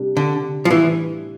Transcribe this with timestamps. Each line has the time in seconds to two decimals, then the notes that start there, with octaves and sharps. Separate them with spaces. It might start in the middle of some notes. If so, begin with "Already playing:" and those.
Already playing: C3 G3 D4 G4
0.17 D3
0.65 F3
0.70 A2 E3 G3 D4 G4